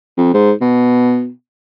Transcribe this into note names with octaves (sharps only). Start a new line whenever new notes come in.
F2
G#2
B2